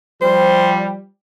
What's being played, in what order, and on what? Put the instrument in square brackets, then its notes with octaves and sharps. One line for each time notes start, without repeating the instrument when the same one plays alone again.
[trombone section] F3 G3 [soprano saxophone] C5